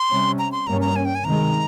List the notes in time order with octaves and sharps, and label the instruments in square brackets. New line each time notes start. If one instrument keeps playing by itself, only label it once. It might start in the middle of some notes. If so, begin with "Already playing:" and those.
Already playing: [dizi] C6
[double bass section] C3 G3 C#4
[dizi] A#5
C6
[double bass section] G2 G3 A#3 C#4 [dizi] A#5
[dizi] A#5
G#5
G5
G#5
[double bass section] C3 D#3 G#3 [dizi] A#5